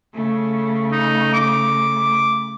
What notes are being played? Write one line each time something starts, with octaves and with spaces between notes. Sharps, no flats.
C#3 A3
D#4
D6